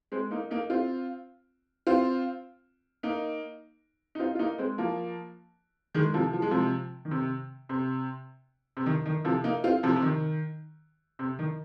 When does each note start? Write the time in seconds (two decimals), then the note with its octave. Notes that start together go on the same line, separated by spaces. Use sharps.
0.12 G#3 C4
0.31 A#3 D#4
0.51 A#3 D#4
0.70 C4 F4
1.87 C4 F4
3.03 A#3 D#4
4.15 D#4
4.19 C4 F4
4.35 F4
4.39 A#3 D#4
4.58 G#3 C4
4.78 F3 A#3
5.94 D#3 G#3
6.14 C3 F3
6.33 F3
6.42 G#3
6.51 C3 F3
7.05 D#3
7.11 C3
7.69 C3
8.77 C3
8.86 D#3
9.05 D#3
9.25 C3 F3
9.44 A#3 D#4
9.64 C4 F4
9.83 C3 F3
9.96 C3
10.02 D#3
11.19 C3
11.39 D#3